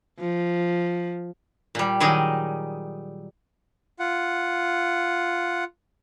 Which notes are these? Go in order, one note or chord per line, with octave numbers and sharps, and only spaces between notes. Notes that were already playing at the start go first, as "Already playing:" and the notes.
F3
A#2 G3
D#3 F#3 G3 D#4 G#4 D#5
F4 F#5